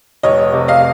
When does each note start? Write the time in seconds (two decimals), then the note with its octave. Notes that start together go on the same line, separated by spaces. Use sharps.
0.23 F1 C#5 D#5
0.53 C3
0.68 D#5 F5